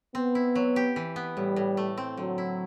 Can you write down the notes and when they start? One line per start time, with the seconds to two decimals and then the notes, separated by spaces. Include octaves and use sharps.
0.14 B3 C4
0.35 E4
0.55 F#3
0.76 G4
0.96 E3
1.16 B3
1.37 A2 G3
1.56 A2
1.77 A3
1.98 C4
2.17 D3 F#3
2.38 E4